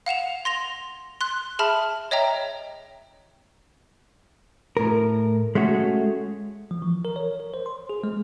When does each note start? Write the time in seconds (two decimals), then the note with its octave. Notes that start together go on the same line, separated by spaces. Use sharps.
0.06 F5 F#5 E7 F7
0.45 C6 A#6 F7
1.21 C6 F#6
1.59 G#4 E5 A5 B5 F6
2.11 C#5 D#5 E5 G5 A#5
4.77 A2 A#4
5.55 G#3 A3 C#4 F#4
6.71 F3
6.82 E3
7.05 A#4
7.16 C#5
7.40 A#4
7.54 C5
7.66 C6
7.89 G#4
8.04 G#3